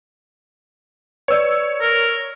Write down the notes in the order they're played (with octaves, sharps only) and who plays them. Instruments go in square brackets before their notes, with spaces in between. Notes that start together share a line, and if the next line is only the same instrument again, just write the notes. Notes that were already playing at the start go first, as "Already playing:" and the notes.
[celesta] B4 D5 [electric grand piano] C#5 E6
[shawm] A#4